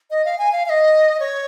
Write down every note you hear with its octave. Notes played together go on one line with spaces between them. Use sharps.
D#5
F5
G#5
F5
F5
D#5
C#5